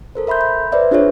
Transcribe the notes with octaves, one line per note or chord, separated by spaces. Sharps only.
A4 A#4 C5
A#4 E5 B5 C6 G6
B5
B4 C5 D5 E5
D4 F4 G#4 B4 C#5